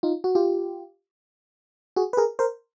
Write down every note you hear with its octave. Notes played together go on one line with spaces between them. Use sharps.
D#4 F4
F#4
F4 G4
F#4 G#4
B4
G#4 A#4
A#4 C5